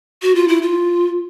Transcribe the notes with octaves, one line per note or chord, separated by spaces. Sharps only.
F#4
F4
E4
F4